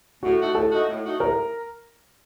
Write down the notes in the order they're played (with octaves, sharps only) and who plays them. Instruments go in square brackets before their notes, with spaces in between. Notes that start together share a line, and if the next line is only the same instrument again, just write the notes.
[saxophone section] A2 [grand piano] F#4
[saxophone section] A3 D#4 F#4
[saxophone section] A2 [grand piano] A4
[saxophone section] A3 D#4 F#4
A2
A3 D#4 F#4
[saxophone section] A2 [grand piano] A#4